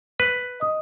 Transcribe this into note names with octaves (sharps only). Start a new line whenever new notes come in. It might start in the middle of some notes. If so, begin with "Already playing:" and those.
B4
D#5 D#6